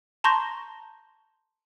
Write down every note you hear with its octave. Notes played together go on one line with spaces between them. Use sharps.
A5 A#5 C6 C#6 G6 A#6